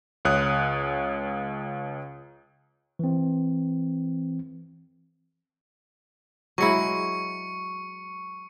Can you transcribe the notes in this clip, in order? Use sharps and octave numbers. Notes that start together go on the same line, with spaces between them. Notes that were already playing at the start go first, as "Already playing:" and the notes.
C#2 C#5 D#6 F#6
E3 C4
F#3 G#3 E4 C#6 C#7